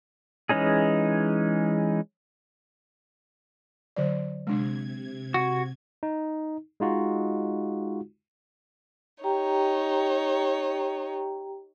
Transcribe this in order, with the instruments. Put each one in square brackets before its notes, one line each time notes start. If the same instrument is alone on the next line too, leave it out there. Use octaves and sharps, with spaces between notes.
[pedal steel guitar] E3 G#3 C#4 D#4 G#4
[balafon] D3 F#3 D5
[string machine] C3 G#6 [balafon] G#3 D4
[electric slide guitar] F#4
[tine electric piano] D#4
G#3 D#4 F4 F#4
[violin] D#4 C#5 [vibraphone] G4 G5 A#5